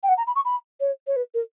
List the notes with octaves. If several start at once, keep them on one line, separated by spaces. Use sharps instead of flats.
G5
F#5
A#5
B5
C#6
B5
C#5
C#5
B4
A#4